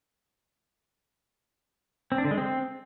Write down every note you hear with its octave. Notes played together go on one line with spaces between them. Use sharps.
C4
D4
D3
G#3
C4